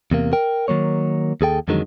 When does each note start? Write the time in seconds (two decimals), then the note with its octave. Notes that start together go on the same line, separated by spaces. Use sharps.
0.11 E2 C3 A#3
0.33 A#4 G5
0.68 D#3 F#3 A#3 C#5
1.41 D#2 G#4 A4 G5
1.68 F2 D3 D#3 F#3 G#3